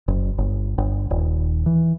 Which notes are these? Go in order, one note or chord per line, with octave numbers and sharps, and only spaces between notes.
F#1
G1
G1
D#1
E3